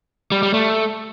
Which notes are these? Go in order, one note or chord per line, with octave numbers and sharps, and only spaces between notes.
G3
G3
A3